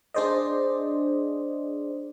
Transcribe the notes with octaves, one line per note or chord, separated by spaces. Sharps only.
D4 G#4 C5 D5 D#5